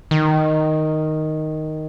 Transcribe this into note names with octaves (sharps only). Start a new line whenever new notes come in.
D#3